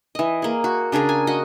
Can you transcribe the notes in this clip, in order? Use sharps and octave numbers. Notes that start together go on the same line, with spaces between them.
E3 D#5
A#3 G#4
F#4
C#3 D4 G#4 A#4
G#5
F#4 D#5